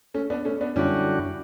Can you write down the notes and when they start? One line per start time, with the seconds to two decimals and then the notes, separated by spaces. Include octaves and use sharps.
0.14 A3 C#4
0.30 B3 D4
0.45 A3 C#4
0.61 B3 D4
0.76 F#2 D3 G3 C#4 D4 E4 F#4